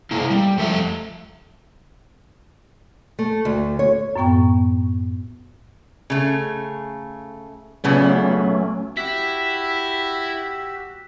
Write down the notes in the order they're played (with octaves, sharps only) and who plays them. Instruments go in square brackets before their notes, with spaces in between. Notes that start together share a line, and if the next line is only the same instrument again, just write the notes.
[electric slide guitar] C3 A#3 E4
G3
F2 F3 A3 A4 E5
[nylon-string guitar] A3
D2
C#5
[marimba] F#2 A2 B3 G5 C#6
[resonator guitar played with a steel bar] C#3 A3
[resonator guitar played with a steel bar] A#2 C#3 B3 [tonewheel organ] F#3 A3 C#4
[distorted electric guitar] E4 [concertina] F#4 G4 E6 [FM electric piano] B6